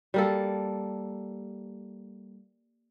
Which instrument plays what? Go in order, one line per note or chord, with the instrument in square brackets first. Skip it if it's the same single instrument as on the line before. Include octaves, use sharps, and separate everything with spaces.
[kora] G3 A#3 A4